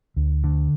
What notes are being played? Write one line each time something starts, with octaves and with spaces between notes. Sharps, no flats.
D2
D3